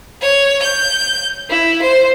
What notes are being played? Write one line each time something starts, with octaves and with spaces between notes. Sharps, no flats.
C#5
G6
E4
C5